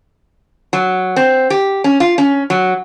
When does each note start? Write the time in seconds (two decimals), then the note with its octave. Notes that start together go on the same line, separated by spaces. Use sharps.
0.73 F#3
1.16 C4
1.50 G4
1.84 C#4
2.00 F4
2.18 C#4
2.50 F#3